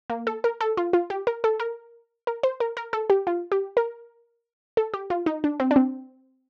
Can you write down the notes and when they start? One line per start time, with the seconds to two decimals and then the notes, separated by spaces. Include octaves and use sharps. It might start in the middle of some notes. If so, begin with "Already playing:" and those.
0.10 A#3
0.27 A4
0.44 A#4
0.61 A4
0.77 F4
0.93 F4
1.10 G4
1.27 A#4
1.44 A4
1.60 A#4
2.27 A#4
2.43 C5
2.60 A#4
2.77 A#4
2.93 A4
3.10 G4
3.27 F4
3.52 G4
3.77 A#4
4.77 A4
4.94 G4
5.10 F4
5.26 D#4
5.44 D4
5.60 C4
5.71 D4
5.76 C4